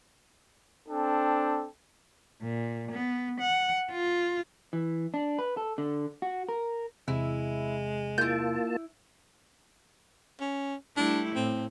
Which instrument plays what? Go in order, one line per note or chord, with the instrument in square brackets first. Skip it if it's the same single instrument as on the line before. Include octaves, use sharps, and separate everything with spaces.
[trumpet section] C4 D4 A4 G5
[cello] A#2
B3
F#5
F4
[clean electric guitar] E3
D4
B4
A4
D3
F#4
A#4
[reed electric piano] E2 C3 [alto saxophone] G#3 [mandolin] E4
[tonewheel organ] A#3 F4 A5 [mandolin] E4 G6
[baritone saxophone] C#4
[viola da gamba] G3 A3 E4 [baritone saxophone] D4
[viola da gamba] A2 [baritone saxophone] C4